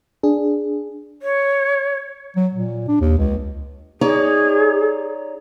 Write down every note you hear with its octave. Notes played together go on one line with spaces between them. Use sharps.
D4 G#4
C#5
F#3
A#2
D4
D#2
C#2
D#4 G#4 C#5 D5